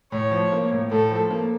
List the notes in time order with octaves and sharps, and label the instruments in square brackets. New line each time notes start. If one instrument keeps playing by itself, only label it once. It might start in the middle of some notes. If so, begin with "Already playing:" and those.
[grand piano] A2 [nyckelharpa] C#5
[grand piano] F3
A#3
A2
[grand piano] A2 [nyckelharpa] A4
[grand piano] F3
A#3